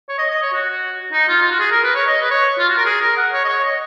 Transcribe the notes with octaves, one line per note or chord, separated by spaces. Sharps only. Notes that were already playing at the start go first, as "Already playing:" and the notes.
C#5
D#5
D#5
C#5
F#4
D#4
F4
F4
F#4
G#4
A#4
B4
C#5
D#5
B4
C#5
F4
F#4
A#4
G#4
A#4
F#5
C#5
D#5
C#5
D#5